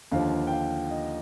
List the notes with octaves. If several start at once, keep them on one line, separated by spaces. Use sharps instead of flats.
D#2 D3 F3 F5
G5
F5
D#5